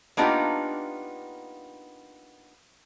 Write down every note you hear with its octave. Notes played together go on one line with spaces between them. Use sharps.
A#3 B3 D4 D#4 F4 G4